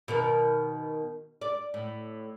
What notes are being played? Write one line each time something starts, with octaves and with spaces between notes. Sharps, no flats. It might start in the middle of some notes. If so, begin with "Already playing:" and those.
B2 D#3 A#4
D5
A2